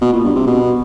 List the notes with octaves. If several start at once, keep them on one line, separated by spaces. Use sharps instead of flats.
B2
A#2
G2
C3
B2